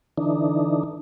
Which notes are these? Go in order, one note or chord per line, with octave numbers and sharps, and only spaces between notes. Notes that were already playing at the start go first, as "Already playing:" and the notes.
D3 E3 D4 D#4